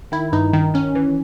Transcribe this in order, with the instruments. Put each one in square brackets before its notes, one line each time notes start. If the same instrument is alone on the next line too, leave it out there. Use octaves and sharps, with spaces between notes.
[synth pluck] D#3 E4
G2 D#4
D#3 D#4
D#3 C#4
E3